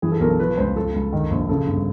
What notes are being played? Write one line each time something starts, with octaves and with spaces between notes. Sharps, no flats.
E3 G#4
A4
B1 A#4
A4
F3 B4
C#2 C5
F3 A4
C#2
D#3
A#1
C#3 A4
G1